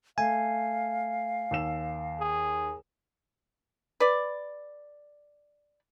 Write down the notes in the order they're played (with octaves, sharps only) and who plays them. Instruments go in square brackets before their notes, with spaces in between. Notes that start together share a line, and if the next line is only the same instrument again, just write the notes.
[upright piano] A3 [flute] F5 [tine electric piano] G#5
[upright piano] D#2 E6 E7
[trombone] G#4
[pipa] B4 D5